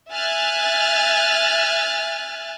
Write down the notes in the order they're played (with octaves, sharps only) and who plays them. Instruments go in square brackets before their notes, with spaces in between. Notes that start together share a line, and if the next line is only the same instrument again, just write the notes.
[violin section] E5 G#5 F6 F#6 A6